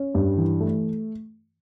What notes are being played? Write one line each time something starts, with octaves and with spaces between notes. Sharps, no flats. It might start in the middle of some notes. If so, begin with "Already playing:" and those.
Already playing: C#4
G2
E3
A3